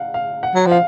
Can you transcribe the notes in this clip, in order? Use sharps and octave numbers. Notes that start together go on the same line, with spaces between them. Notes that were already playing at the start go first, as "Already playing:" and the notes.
Already playing: F5 F#5
F5
F#5
F#3
F3
F5